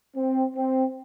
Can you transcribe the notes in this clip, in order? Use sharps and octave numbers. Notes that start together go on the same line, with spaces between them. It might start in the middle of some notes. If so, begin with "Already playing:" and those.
C4
C4